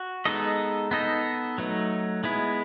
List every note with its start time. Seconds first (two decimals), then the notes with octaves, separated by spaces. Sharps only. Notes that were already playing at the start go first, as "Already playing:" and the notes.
Already playing: F#4
0.25 G#3 B3 D#4 A4 D#5
0.91 B3 D#4 A4 D#5
1.58 F#3 A3 D#4
2.24 G#3 B3 E4